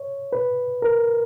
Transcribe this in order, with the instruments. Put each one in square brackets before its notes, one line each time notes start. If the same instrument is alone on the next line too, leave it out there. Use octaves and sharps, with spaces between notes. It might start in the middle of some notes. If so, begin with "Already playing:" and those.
Already playing: [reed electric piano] C#5
B4
A#4